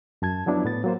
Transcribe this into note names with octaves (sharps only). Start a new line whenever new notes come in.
F#2 A5 G#6
F3 F#3 B3 D4 E4
A2 B3 A6
F#3 A#3 C5